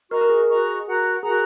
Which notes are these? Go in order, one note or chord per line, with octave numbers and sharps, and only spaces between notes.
F#4 A#4 D#5 A#5 C#6
A#4
G#4
F#4 D#5 A#5 C#6
F#4 A#4 F#5 A#5
F#4 G#4 A#4 F#5 A#5